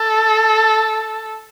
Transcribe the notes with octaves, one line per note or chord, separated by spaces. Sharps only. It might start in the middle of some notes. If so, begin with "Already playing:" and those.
Already playing: A4